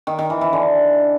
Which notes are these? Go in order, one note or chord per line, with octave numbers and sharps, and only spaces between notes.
D#3
D#3
E3
E3
D3